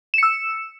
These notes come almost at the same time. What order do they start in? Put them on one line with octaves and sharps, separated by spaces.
E7 C#7 E6